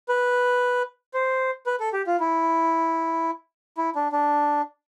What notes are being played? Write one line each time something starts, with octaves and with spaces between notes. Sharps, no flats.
B4
C5
B4
A4
G4
F4
E4
E4
D4
D4